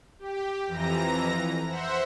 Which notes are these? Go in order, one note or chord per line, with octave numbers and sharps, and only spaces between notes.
G4
F2 E3 A#5 A#6
C5 E5 F#5